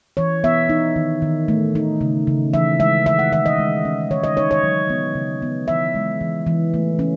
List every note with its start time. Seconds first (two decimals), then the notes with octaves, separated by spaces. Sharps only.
0.17 E3 C#5
0.44 B3 E5
0.69 D#4
0.96 D#3
1.22 D#3
1.48 A3
1.75 D#4
2.01 C#3
2.27 C#3
2.54 E3 E5
2.80 G#3 E5
3.06 D#3 E5
3.19 F#5
3.32 D#3 E5
3.46 D#5
3.58 G#3
3.85 C#4
4.10 D#3 C#5
4.24 D#5
4.37 D#4 C#5
4.51 C#5
4.63 F#3
4.90 B3
5.15 C#3
5.42 B3
5.68 E3 E5
5.95 G#3
6.21 E3
6.46 E3
6.74 A3
6.99 C#4